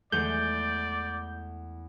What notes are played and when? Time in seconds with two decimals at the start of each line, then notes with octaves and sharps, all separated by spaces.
0.12 E2 E3 G#3 A3 G#4 D5 G6